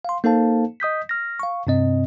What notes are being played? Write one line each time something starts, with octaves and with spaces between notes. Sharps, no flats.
F5 C6
A#3 D#4 A4 C5 F5 A5
D#5 D#6 G6 B6
F6 A#6
F5 C#6
G2 C3 C4 D#5